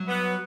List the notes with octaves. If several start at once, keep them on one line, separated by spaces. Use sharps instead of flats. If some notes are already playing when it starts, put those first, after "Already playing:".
Already playing: F#3
B3